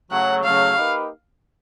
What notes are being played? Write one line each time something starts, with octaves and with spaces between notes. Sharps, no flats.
C#3 F#3 A3 F#5
C#3 F#3 A3 F5
A#3 D#4 G4 B4